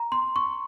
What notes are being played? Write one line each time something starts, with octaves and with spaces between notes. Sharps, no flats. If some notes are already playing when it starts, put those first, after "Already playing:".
Already playing: A#5
C6
C#6